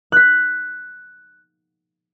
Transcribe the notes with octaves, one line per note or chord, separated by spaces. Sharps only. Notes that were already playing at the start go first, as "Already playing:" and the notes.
F#6 B6